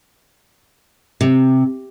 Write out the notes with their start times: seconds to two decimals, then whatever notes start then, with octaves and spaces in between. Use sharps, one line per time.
1.21 C3